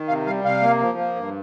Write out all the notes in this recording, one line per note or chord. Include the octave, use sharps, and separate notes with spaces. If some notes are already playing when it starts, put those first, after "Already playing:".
Already playing: D#3
C3 F5
G3 F5
C3 F5
A#3
F3
A#3
G2